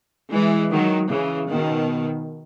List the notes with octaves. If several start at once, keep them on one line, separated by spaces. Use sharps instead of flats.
E3 G#3
D#3 F#3
C#3 E3
B2 D#3